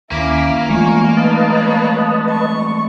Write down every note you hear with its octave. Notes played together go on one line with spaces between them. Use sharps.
D#2 A#3 C#4 E4 B5 D6
E3 F3 G#3 A3 G#5 C#6
D#4 B4 D#5 F5 A5
C#5 B5
C#6